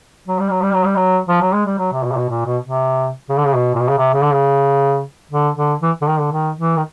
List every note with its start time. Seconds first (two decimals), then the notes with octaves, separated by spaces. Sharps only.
0.28 F#3
0.39 G3
0.50 F#3
0.62 G3
0.74 F#3
0.85 G3
0.96 F#3
1.28 F3
1.41 F#3
1.53 G#3
1.66 G3
1.78 F#3
1.92 C3
2.03 B2
2.12 C3
2.17 B2
2.29 A#2
2.46 B2
2.63 C3
3.29 C#3
3.37 D3
3.45 C#3
3.55 B2
3.75 A#2
3.80 B2
3.88 C#3
3.97 C3
4.13 C#3
4.23 D3
4.32 C#3
5.31 D3
5.56 D3
5.82 E3
6.01 D3
6.07 D#3
6.19 D3
6.32 D#3
6.58 E3
6.76 D#3